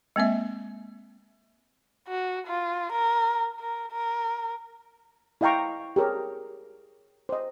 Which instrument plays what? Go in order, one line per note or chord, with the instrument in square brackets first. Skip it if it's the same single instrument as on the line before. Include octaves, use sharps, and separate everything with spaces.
[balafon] G#3 A#3 C4 E5
[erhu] F#4
F4
A#4
A#4
A#4
[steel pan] E4 D#5 F5 G5 A#5 C#6
G4 G#4 A#4 C#5
C5 D#5